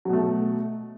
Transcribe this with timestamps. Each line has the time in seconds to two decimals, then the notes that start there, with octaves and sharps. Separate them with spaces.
0.05 F#3
0.09 B2
0.13 A3